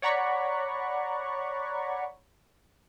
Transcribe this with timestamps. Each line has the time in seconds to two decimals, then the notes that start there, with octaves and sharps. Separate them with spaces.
0.02 C#5 D5 F#5 A#5 B5 C#6